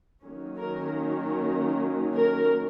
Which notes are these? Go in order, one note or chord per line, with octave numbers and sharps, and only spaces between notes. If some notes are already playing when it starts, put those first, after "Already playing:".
D#3 F#3 A#3 C#4
A#4
A#4
A#4